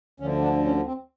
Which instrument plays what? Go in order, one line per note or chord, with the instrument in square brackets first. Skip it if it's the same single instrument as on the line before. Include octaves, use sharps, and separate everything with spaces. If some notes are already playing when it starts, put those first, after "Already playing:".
[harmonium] D2 D3 F3 C#4
D4
C#4
C4